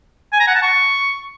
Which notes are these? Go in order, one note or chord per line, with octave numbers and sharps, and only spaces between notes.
G#5
A#5
F#5
A5
C#6